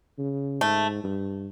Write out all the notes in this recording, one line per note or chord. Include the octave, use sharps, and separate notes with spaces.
C#3
G#2 A3
G2